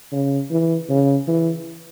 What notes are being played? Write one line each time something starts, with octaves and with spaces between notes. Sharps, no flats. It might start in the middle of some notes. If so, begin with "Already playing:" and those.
C#3
E3
C#3
E3